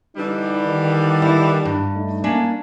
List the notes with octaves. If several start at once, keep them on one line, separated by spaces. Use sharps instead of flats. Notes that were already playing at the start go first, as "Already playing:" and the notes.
D3 E3 G3 D#4
D#3
E4
G2
A3 D#4
A#3 C#4 D4